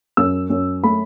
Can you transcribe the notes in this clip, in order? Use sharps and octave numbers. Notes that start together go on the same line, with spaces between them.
F#2 E6
F#2
A3 B5